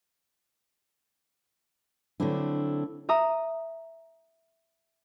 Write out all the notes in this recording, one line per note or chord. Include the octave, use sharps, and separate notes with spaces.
D3 F#3 A3 C4 D4 E4
E5 A#5 D#6